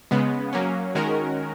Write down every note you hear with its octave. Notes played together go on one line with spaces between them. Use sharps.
C#3 G#3 B3
F#3 A#3 C#4
D#3 G#3 C#4 F#4 A#4